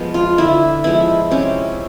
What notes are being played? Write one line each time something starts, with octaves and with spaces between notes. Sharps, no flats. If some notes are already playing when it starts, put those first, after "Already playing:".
Already playing: F3 G#3 B3
F4
D3 E4
F3 G#3 B3 E4
C3 C#4